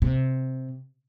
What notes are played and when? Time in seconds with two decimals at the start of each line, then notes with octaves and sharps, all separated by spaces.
0.02 C3